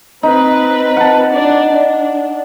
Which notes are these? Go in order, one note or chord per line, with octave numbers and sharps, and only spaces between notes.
C4 D#4 B4
F#5 A5
D4 D5
D4